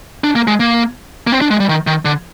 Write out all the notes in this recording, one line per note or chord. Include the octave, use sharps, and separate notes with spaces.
D4
A#3
G#3
A#3
A#3
C4
D4
G#3
G3
D#3
D#3
D3